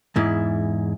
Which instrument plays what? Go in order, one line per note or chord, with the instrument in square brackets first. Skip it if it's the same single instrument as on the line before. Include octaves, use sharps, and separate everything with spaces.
[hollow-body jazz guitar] E2 G#2 E4